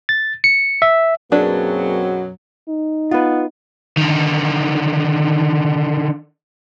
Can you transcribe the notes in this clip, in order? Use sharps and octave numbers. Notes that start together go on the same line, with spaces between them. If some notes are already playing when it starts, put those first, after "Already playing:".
A6
C#7
E5
F#2 B2 F#3 A#3 C4 D4 G#4 B4
D#4
B3 F4 B4
D3 D#3